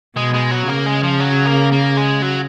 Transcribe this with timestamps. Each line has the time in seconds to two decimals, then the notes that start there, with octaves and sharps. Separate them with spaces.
0.17 B2 G#3
0.34 G#3
0.51 F#3
0.68 C#3 A#3
0.86 G#3
1.03 F3
1.20 F#3
1.45 A#3
1.72 A#3
1.97 G#3
2.22 F#3